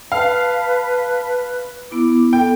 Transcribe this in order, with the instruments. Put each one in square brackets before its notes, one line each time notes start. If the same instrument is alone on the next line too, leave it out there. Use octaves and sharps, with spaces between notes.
[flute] B4 [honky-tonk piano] F5 [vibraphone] A5
[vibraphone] B3 E4 D6
[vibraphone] B3 A4 [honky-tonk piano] G5